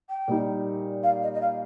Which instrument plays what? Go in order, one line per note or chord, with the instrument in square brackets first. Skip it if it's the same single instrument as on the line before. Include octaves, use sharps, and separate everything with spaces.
[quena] G5
[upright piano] A#2 G3 D#4
[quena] F5
D#5
D#5
F5